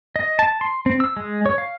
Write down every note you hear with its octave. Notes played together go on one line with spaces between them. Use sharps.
D#5
A5
C6
C4
E6
G#3
C#5
F5